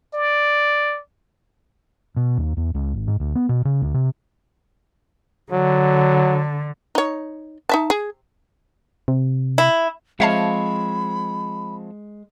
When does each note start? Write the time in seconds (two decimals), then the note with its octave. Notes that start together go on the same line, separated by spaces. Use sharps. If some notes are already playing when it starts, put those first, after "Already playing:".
0.14 D5
2.16 B2
2.38 D#2
2.57 E2
2.74 C#2
2.94 G#1
3.07 G#2
3.20 D2
3.35 B3
3.49 B2
3.65 C#3
3.82 D2
3.94 C3
5.52 D3 F#3
6.95 D#4 C#5
7.69 D#4 E5 A5
7.90 G#4
9.08 C3
9.58 E4
10.20 F3 G#3 C4 C#5 E5 F5 A5 B5